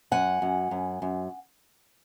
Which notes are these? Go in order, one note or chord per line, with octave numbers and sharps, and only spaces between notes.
F#2 F#5 G#5
F#2
F#2
F#2